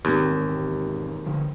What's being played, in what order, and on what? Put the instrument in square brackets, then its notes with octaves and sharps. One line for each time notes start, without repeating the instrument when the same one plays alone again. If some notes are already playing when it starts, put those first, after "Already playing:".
[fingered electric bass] E1 G#2 C4 [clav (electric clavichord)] D#2
[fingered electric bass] D3 F3